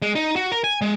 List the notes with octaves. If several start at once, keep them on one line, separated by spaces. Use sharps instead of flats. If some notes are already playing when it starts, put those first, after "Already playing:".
G#3
D#4
F#4
A#4
G#5
G#3